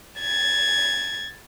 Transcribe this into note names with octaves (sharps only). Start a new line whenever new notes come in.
G#6 A6